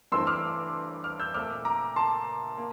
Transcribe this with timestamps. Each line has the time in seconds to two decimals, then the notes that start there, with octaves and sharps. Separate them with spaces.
0.12 G2 E3 A3 C4 C6 E6
0.27 D6 F6
1.04 D6 F6
1.20 E6 G6
1.34 A#2 A3 C4 D6 F6
1.65 A#5 D6
1.96 A5 C6
2.58 A#3